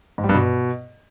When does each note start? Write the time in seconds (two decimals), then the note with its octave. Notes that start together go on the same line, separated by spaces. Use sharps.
0.18 G#2
0.24 G3
0.29 G2
0.35 B2